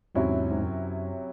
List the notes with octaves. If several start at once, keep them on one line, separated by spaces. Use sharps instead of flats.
E2 G#2 C3 F#3 C#4 E4
G#2
F#2